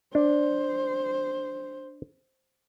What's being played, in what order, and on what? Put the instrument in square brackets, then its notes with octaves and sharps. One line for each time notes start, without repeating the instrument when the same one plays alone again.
[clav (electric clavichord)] D4 [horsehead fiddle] C5